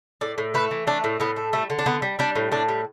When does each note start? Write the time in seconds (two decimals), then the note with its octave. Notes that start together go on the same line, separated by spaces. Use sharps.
0.21 A2 D5
0.38 A2
0.54 A3 B4
0.71 E3
0.87 A3 D4
1.04 A2
1.20 A2 B3
1.36 A3
1.53 G3 A3
1.70 D3
1.79 D4
1.86 D3 B3
2.02 G3
2.19 G3 D4
2.36 A2
2.52 A2 D4
2.68 G3